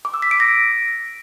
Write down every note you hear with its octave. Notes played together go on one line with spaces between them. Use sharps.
D6
E6
B6
D7
A#6